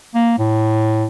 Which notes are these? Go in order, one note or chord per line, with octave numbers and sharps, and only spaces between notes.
A#3
A2